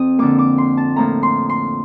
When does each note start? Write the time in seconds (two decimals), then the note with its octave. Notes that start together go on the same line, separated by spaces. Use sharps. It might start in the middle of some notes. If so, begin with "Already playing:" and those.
Already playing: F2 C4 D#6
0.19 D3 F3 A#3 D6
0.39 D6
0.58 C6
0.77 A5
0.96 A2 F3 A#3 A#5
1.23 C6
1.50 C6